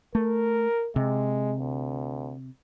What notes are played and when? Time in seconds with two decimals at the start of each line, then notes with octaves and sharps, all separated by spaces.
0.15 A3 A#4
0.96 C3 G#3
1.60 D2